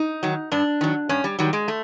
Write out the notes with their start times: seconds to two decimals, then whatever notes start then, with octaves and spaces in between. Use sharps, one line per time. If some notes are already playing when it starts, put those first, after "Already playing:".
Already playing: D#4
0.23 D#3 F#3
0.51 G2 D4
0.81 D#3 F#3
1.09 G2 C#4
1.24 G3
1.39 D#3 F#3 G3
1.53 G#3
1.68 A3